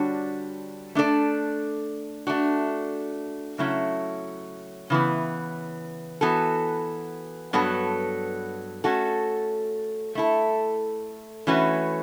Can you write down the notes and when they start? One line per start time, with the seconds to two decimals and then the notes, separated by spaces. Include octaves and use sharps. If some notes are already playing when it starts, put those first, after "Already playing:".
Already playing: D3 G3 D4 F#4 C#5
0.95 A3 D4 A4 D5
2.27 A3 D4 F#4
3.58 C#3 F#3 A3 C#4 E4
4.90 C#3 E3 B3
6.21 E3 B3 F#4 A4
7.53 G2 F#3 B3 F#4 A4
8.84 A3 C#4 F#4 A4
10.15 A3 E4 A4
11.47 E3 A3 C#4 F#4 B4